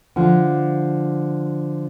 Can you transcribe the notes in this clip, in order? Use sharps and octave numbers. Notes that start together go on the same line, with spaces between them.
D3 F3